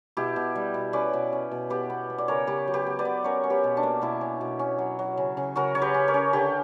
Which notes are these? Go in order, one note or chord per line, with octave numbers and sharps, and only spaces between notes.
B2 E4 G4
B2
G3
B2
C#4 B4 D5
B2
C#4
B2
B3 G4 B4
B3
B3
D5
C#3 A#4 C#5
C#3 G4 B4
F#3
G4 B4
B3
B4 D5
B3
C#4 A#4 C#5
C#4
G4 B4
B2
D4
A#3
B2 E4
C#4
B2
C#4
F#3
F#3
C#3
C#3
C#3 F#4 A#4
C#3 C#5
G4 B4
C#4
A#4 C#5
C#4
D3 G4 B4